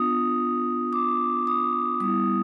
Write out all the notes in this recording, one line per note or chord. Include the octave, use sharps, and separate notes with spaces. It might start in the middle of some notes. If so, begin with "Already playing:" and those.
Already playing: B3 D4 F4 D#6
D6
D#6
G3 B3 E4 D#6